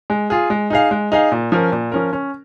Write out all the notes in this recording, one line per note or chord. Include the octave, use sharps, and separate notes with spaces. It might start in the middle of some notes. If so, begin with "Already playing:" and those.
G#3
F4 G#4
G#3
D#4 G#4 F5
G#3
D#4 G#4 F5
A#2
F3 C#4 A#4
A#2
F3 C#4 A#4
C#4